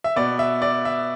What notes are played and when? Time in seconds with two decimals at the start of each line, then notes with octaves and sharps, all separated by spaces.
0.04 E5
0.16 B2 B3 D5
0.39 E5
0.62 D5
0.85 E5